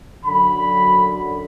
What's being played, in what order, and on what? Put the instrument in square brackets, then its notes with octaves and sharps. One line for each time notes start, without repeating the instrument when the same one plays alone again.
[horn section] F#2 D3 F#3 B5